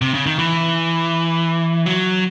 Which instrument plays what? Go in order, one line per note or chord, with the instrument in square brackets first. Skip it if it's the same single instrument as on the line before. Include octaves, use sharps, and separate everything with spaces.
[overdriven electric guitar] C3
C#3
D#3
E3
F#3